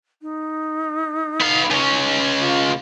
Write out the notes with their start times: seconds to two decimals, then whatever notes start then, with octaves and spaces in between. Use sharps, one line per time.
0.22 D#4
1.41 B3 F5
1.71 C#2 C#4
2.39 F4